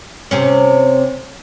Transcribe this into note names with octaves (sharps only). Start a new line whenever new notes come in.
C3 C4 C#4